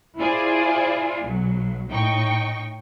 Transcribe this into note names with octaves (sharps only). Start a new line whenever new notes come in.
E4 F4 G#4 C5 D5 G#5
B1 F#3
A2 D#4 G5 C#6